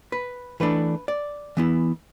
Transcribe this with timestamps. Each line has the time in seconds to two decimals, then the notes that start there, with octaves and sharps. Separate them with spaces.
0.12 B4
0.60 E3 A3 D4 B4
1.08 D5
1.57 E3 B3 E4